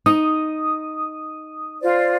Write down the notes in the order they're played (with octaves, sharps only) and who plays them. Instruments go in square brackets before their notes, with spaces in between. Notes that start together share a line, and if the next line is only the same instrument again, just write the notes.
[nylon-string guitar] D#4 [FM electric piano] D#6
[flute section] F4 C5 D5